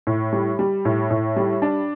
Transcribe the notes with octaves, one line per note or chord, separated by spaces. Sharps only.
A2
G3
G3
A2
A2
G3
D4